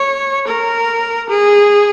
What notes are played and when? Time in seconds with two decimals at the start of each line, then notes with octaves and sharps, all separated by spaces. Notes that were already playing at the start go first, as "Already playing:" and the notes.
Already playing: C#5
0.47 A#4
1.29 G#4